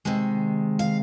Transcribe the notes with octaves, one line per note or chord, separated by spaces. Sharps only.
C3 D#3 G#3
F5